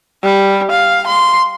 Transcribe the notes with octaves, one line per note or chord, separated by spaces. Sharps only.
G3
F5
C6